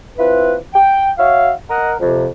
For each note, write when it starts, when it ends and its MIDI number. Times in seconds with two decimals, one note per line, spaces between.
0.17 0.56 60
0.17 0.56 64
0.17 0.56 65
0.17 0.56 71
0.74 1.09 79
1.18 1.51 66
1.18 1.51 73
1.18 1.51 76
1.18 1.51 77
1.70 1.93 70
1.70 1.93 75
1.70 1.93 78
1.99 2.26 41
1.99 2.26 48